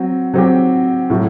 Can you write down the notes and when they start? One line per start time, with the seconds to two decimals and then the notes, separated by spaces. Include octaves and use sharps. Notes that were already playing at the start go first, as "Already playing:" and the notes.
Already playing: F#3 C4
0.34 F#3 C4 G4
1.10 A2 F#3 A3